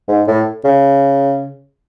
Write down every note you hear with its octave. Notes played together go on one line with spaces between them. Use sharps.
G#2
A2
C#3